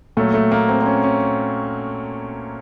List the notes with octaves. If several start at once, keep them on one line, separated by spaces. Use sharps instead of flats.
A#2 F#3 A3
A3
A#3
C4
C4
C#4
C#4